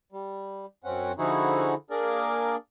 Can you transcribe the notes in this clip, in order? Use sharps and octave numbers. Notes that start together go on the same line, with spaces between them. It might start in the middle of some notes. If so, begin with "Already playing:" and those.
G3
F#2 C4 C#4 F#5
D3 F3 D#4 E4 F#4 G#4
A#3 D4 G#4 A#4 D5